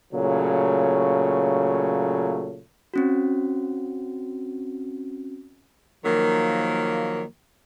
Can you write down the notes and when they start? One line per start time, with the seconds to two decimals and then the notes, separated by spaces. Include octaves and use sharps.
0.13 A#2 C#3 F#3 A3
2.94 C4 C#4 F#4
6.05 D#3 F3 F#3 A#3